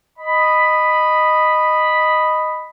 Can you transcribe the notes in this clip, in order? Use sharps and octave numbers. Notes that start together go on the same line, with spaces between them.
D#5 B5